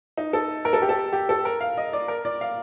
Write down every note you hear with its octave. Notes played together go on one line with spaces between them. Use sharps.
D#4
A4
A#4
A4
G4
A4
G4
A4
A#4
F5
D#5
D5
A#4
D5
F5